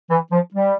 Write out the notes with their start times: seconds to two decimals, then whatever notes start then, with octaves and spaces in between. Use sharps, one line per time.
0.10 E3
0.32 F3
0.54 G3